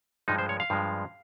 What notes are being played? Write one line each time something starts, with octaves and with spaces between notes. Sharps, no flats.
G2 F3 G#3 D#4
C5
C#5
F5
G2 F3 G#3